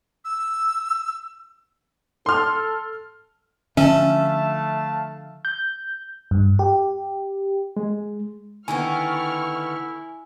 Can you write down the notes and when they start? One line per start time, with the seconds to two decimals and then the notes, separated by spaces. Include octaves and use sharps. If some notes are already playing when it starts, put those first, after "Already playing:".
0.25 E6
2.26 A4 C6 F6
3.77 D3 F3 A3 C#4 E5 F5 A5
5.45 G6
6.31 G2
6.59 G4
7.77 G#3
8.68 D3 D#3 B3 E4 G#5 C#6 F6